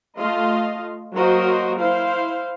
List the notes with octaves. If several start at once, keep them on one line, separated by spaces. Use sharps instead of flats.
A3 F4 D#5 F5 C6
F#3 A#3 F#4 A#4 C5 D#5
E4 C5 F5